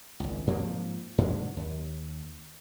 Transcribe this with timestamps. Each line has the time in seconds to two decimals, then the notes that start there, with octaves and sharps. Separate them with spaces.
0.20 G#1 C#2
0.47 G#2 F3 A#3 C4
1.18 G#2 D3 F#3 G#3
1.57 D#2